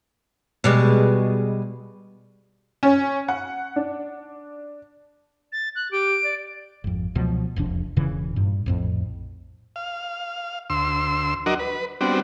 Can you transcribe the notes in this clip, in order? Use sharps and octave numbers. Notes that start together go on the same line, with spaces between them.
B2 G3 G#3
C#4
F#5
D4
A6
F#6
G4 D7
D5
G#1 F2
C#2 B2 F3 F#3
E1 C2 F2 D4
E1 A#2 C#3 E3
G2 A#2
A#1 F2 A2
F5
D2 C6 E6
F#3 D4 F#4 A#4 D#5
B4
G3 B3 C4 D4 F#4